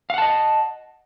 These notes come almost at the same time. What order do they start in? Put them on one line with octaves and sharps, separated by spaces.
F5 F#5 A5 D#5